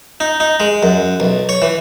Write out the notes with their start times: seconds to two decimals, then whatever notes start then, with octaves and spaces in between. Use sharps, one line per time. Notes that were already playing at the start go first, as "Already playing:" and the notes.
0.20 D#4
0.40 D#4
0.60 G#3
0.83 F#2
1.20 B1
1.49 C#5
1.62 E3